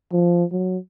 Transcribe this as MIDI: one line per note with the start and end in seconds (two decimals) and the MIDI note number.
0.12 0.44 53
0.52 0.77 54